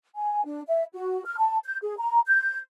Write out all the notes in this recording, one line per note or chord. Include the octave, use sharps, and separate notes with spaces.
G#5
D4
E5
F#4
F6
A5
G6
G#4
A#5
G6